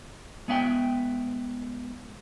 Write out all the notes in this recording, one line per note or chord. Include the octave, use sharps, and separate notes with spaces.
G#3 B3 E5 F#5 G5